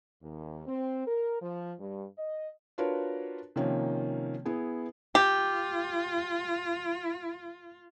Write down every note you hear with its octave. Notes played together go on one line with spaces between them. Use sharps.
D#2
C4
A#4
F3
G2
D#5
D4 F4 F#4 A#4 B4 C#5
C3 D#3 F3 A#3 C#4
B3 E4 G#4
F4 G4